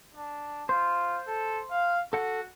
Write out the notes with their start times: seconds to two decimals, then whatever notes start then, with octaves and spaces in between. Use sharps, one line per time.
0.15 D4
0.69 F4 C5
1.27 A4
1.71 F5
2.13 F#4 A4 F#5